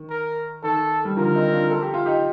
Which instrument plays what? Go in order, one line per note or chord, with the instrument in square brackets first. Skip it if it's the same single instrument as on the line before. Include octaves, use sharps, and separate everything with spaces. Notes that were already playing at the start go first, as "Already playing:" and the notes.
Already playing: [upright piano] D#3
[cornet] A#4
[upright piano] D#3 [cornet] A4
[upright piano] G3
[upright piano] D3 F3 [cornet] A#4
[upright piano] C4 D#4
D4 F4
A4
G4
F4
D#4 G4